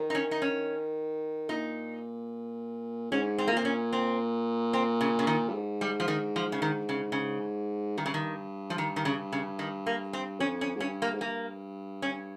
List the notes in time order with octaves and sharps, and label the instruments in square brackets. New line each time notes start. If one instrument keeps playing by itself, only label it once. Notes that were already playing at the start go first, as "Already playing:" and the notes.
Already playing: [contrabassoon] D#3
[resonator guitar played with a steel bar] D#4
C#4
D#4
C#4
[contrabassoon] A#2 [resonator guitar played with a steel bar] D#4
[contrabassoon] G#2 [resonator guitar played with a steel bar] C#4
[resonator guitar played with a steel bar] C4
A#3
[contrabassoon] A#2 [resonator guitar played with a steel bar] C4
[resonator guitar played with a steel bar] C#4
C4
C4
C#3
C#3
D#3
[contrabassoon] G2
G#2
[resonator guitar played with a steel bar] G3
F3
D#3
F3
C#3
D#3
C#3
C#3
[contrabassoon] G2 [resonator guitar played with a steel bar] D#3
[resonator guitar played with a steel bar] C#3
D#3
F3
D#3
D#3
C#3
C#3
D#3
A#3
C4
[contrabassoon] F2 [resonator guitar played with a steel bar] C#4
[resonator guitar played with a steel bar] C#4
[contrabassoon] G#2
[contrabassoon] G2 [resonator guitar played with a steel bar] C#4
[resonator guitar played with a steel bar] A#3
[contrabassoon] G#2
[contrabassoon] G2 [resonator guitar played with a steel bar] A#3
[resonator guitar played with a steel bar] C#4